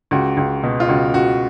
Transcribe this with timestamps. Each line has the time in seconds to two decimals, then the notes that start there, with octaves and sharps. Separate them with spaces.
0.11 C#2 F#4
0.37 C#2
0.63 B2
0.80 F4
0.88 C#2 F#4
1.14 C#2 F#4